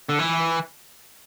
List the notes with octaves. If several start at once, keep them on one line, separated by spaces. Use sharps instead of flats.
D3
E3